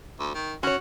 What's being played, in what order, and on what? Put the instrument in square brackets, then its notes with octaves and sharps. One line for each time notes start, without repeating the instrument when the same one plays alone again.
[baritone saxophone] D2
D#3
[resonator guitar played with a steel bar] C#4 C#5 [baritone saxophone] F#4